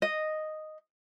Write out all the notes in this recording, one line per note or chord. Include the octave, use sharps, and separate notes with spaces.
D#5